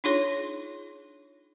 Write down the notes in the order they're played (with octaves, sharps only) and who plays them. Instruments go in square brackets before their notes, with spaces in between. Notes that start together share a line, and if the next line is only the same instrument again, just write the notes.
[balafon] D4 D#4 F4 G#4 C#5 C6